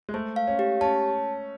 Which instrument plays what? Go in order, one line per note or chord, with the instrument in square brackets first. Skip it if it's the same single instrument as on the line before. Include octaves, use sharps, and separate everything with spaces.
[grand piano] G#3
[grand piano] A3 [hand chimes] C5
[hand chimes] F5
[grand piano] C#4
[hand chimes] G4
[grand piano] C#4 [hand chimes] A5